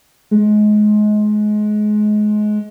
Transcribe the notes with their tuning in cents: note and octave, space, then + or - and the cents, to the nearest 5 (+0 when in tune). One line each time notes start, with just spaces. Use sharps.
G#3 +25